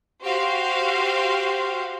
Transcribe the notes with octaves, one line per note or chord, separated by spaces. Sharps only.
F#4 G4 C5 F5